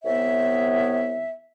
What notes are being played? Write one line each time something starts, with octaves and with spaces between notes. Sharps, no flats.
C2 B3 C#5 E5